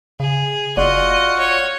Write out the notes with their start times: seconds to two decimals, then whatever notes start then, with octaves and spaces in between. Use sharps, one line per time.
0.20 C#3 G#4
0.77 F#1 F4 F#4 D5 D#5 F#5
1.39 C#5